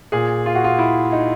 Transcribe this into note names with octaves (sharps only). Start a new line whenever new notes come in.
A#2 G#4
F4
F#4
F4
E4
D#4